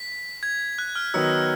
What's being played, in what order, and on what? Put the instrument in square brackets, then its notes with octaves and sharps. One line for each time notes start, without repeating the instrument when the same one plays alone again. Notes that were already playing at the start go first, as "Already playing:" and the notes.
Already playing: [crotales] B6
G#6
F#6
F6
[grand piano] D#3 F#3 B3 D#4 [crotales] E6